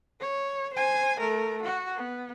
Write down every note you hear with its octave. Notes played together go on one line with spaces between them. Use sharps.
C#5
C5 G#5
A3 A#4
F#4
B3